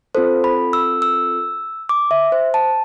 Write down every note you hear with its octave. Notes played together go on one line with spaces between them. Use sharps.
C4 F4 A4 C5
B5
E6
E6
D6
E5
C5
A5